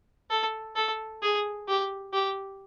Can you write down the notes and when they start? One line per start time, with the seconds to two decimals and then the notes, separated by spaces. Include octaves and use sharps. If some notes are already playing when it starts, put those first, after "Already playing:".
0.30 A4
0.76 A4
1.23 G#4
1.68 G4
2.14 G4